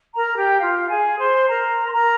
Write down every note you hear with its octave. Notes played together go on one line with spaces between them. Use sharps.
A#4 A#5
G4 G5
F4 F5
G#4 G#5
C5 C6
A#4 A#5
C6
A#4 A#5